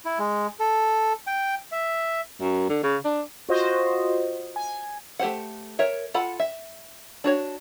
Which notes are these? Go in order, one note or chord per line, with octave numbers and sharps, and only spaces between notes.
E4
G#3
A4
G5
E5
F#2
D3
C#3
D4
F4 F#4 C5 D#5
G#5
A3 G4 C5 F#5
A#4 C#5 E5
F4 A4 F#5 B5
E5
D4 F#4 C#5